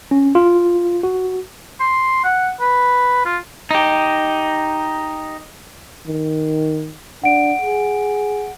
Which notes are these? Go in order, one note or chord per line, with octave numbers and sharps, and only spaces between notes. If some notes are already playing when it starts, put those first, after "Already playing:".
C#4
F4
F#4
C6
F#5
B4
F4
D#4 G4
D#3
D4 F#5 D7
G#4